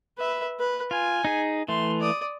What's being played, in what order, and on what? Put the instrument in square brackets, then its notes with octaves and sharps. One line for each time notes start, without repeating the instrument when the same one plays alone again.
[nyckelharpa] B4 E5
B4
[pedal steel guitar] F4 [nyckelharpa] G#5
[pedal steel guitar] D#4 G#4
[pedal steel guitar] E3 A3 [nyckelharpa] C6
[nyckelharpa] D5 D#6